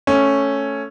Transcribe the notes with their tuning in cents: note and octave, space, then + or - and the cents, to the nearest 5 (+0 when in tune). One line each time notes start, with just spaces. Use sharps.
A3 +0 C#4 +0